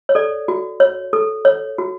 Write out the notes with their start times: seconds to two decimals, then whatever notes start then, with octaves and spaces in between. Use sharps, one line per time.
0.09 C#5
0.15 A4 D5
0.48 F#4
0.80 C#5
1.13 A4
1.45 C#5
1.78 F#4